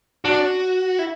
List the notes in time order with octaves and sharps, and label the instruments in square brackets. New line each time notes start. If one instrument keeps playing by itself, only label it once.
[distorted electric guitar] D4 [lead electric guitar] F#4
[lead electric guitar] E4